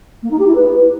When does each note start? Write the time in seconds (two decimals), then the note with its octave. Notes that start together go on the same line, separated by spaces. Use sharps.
0.22 A#3
0.30 D#4
0.39 G4
0.47 E4
0.55 B4